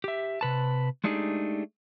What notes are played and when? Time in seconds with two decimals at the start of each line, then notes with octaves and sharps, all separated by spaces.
0.04 G4 E5
0.41 C3 B4 A5
1.04 G#3 A3 D4 D#4 G4 G#4